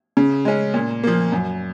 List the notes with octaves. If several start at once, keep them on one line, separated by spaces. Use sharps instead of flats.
C#3
G#3 C#4
A#2
F3 A#3
F#2